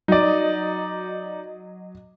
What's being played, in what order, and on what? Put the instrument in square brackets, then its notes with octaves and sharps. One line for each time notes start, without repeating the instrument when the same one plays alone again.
[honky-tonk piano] F#3 D#5 [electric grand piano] D#4 D5